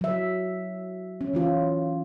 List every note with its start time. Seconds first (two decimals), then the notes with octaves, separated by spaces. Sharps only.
0.01 F#3 E5
1.21 C#4
1.33 E3 C#4 F4